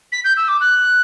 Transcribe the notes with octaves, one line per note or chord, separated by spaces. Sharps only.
B6
G6
E6
D6
F#6